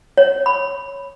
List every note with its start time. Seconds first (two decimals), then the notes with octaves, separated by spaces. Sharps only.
0.18 C#5
0.46 B5